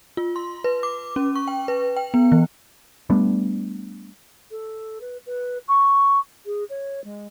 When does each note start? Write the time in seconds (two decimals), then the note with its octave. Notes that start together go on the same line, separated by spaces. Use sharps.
0.17 F4
0.36 C6
0.64 B4
0.83 D6
1.16 C#4
1.35 C#6
1.48 G5
1.68 B4
1.96 G5
2.14 B3
2.32 E3
3.10 G3 A3 B3 D4
4.51 A4
5.01 B4
5.26 B4
5.68 C#6
6.46 G#4
6.70 C#5
7.04 G#3